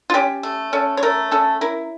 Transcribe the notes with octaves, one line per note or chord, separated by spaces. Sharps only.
F4
C#4 G4
A3
C#4 A4
C#5
A3 A#4
C#4 A4
E4 A#4